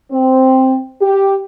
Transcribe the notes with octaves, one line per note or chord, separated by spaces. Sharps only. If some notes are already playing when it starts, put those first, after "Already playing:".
C4
G4